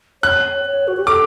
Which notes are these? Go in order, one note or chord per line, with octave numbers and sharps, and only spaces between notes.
C#5 F#6
C#5
F#4
G4
A4 D6